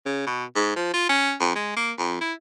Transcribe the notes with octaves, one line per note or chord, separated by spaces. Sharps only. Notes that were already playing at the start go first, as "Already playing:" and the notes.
C#3
B2
G#2
F3
F4
C#4
F2
G#3
A#3
F2
E4